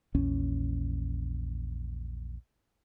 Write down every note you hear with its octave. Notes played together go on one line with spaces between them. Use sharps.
A#1 E2 C#4